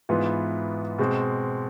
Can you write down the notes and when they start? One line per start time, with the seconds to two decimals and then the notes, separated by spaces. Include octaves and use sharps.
0.09 G#2 E3 B3 F4
0.98 B2 G#3 C4